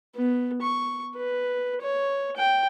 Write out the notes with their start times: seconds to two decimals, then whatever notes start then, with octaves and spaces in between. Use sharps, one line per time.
0.16 B3
0.62 C#6
1.17 B4
1.82 C#5
2.37 G5